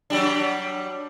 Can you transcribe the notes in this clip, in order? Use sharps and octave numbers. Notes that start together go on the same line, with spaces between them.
F#3 G3 D4